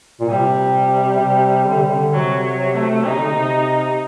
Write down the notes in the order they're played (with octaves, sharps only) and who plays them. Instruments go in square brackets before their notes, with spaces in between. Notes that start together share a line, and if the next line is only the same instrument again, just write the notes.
[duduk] A#2
[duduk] C3 [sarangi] G3
[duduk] C3
D3
C3
D3
[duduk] C3 [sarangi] F#3
[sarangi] F#3
A3
[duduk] C3 [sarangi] D#4
[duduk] D3
C3